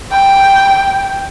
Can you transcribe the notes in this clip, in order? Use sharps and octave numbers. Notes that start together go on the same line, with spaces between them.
G5